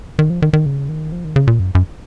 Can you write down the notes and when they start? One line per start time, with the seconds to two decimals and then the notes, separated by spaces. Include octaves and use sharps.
0.19 D#3
0.30 F3
0.42 D#3
0.53 D#3
0.66 C#3
0.89 D#3
1.12 F3
1.24 D#3
1.36 C#3
1.47 A#2
1.59 F#2
1.75 F#2